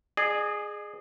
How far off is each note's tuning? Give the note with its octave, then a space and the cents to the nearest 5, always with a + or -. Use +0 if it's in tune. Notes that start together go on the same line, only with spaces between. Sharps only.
G#4 +0 D#5 -45